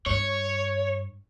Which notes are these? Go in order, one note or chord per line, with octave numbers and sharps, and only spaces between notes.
G2 C#5